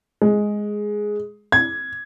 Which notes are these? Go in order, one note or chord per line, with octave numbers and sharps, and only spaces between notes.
G#3
G#6